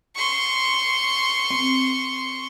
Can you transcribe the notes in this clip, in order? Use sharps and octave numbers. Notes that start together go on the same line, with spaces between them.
C6 C#6
C4